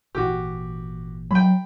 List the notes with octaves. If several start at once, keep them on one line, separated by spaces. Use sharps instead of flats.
G#1 A#2 E3 F#4 G4
F#3 G5 B5